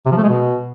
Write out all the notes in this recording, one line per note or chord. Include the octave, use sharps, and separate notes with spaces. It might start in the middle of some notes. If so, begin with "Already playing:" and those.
C3
F3
A3
G#3
B2